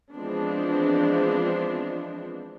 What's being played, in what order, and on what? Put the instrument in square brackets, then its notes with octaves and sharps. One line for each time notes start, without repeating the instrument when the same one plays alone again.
[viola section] E3 F3 G#3 B3 C4 D4